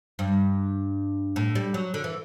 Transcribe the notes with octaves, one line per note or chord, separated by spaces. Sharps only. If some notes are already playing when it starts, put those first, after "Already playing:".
G2
A2
G3
F#3
D3
E3